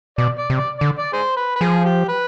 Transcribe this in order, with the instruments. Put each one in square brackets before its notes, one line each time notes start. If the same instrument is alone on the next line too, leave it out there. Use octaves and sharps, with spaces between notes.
[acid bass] B2 [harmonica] D5
[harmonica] D5
[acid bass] C3
[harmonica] D5
[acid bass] D3 [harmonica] D5
[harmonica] D5
G#4 C5
B4
B4
[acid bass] F3 [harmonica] G#4
[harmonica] G4
B4